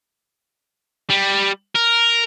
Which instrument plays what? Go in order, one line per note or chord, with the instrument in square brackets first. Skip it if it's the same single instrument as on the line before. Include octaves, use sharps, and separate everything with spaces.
[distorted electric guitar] G3
A#4